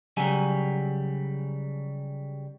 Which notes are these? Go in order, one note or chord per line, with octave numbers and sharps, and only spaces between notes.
C#3 F#3 G3 G#5